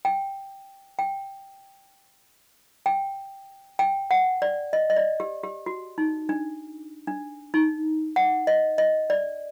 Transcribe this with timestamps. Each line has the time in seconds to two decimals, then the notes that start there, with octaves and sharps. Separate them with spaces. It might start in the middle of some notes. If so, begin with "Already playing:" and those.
0.05 G5
0.99 G5
2.86 G5
3.79 G5
4.11 F#5
4.42 D5
4.73 D#5
4.90 D#5
4.96 D5
5.20 G4
5.43 G4
5.66 F#4
5.98 D#4
6.29 D4
7.07 D4
7.54 D#4
8.16 F#5
8.47 D#5
8.78 D#5
9.10 D5